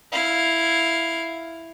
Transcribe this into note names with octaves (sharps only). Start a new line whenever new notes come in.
E4 F5